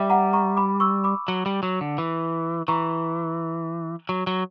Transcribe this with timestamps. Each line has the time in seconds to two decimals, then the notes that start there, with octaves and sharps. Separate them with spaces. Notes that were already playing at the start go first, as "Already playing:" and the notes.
Already playing: G3 E5 G5
0.10 F#5 A#5
0.33 A#5 C#6
0.57 B5 D6
0.80 C#6 E6
1.04 B5 D6
1.28 F#3
1.46 G3
1.63 F#3
1.81 D3
1.98 E3
2.68 E3 A#5 C#6
4.09 F#3
4.27 F#3